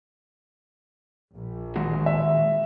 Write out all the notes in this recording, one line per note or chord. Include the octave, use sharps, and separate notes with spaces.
A#1
D#3 G#3 F#4
E5